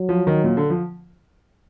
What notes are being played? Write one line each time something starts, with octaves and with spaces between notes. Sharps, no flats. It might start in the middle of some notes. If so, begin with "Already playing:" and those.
Already playing: F#3
F3
D#3
A#2
D3
F3